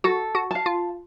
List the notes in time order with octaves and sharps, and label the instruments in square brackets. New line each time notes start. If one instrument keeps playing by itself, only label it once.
[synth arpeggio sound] F#4 [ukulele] A4
[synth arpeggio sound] F#4
[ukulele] F5 A5
[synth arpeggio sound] F4